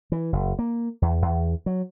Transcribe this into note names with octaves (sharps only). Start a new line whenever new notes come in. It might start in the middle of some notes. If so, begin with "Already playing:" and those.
E3
F#1
A#3
E2
E2
F#3